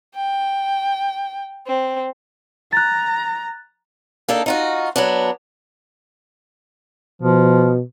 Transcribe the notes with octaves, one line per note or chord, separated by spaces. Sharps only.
G5
C4
A#5 F#6 A6
A#3 D4 D#4 A4
D#4 F4 F#4
F#3 B3 D4
B2 F3